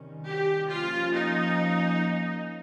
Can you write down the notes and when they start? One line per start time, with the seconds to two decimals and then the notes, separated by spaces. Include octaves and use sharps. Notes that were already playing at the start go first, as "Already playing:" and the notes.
Already playing: C3 D#3 G3 C#4
0.25 G4
0.69 F3 A#3 C#4 F4
1.14 D#4